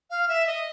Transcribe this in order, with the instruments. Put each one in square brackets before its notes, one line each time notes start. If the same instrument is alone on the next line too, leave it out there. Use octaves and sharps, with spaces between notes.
[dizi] F5
E5
D#5